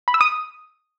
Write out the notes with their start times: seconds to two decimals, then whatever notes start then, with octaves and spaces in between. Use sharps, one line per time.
0.08 B5
0.14 E6
0.21 D#6